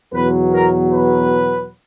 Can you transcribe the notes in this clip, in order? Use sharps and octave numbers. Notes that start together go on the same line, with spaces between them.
E2 B2 F#3 B4
A#4
B4